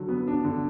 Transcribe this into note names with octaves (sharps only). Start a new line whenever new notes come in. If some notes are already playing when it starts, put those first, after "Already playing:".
Already playing: D3 F#3
B3
D4
D3